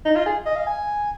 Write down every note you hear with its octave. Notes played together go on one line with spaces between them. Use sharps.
D#4
F4
G#4
D#5
F5
G#5